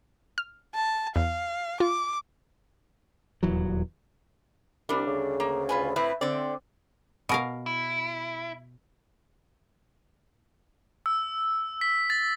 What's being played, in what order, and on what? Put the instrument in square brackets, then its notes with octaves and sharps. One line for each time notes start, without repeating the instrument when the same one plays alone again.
[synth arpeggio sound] F6
[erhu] A5
[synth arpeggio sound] E2 [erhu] F5
[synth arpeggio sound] F4 [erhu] D6
[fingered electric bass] D#1 E2 E3 F#3
[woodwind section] C2 [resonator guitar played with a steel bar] G3 D4
[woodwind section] D2 C#3
[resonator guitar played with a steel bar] A#3
F4 B4 G#5
[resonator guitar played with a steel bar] A2 C4 E4 [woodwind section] B4
[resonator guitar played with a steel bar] D3 D5 [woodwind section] C4
[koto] B2 A#4 F5
[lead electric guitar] E4
[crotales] E6
B6
A6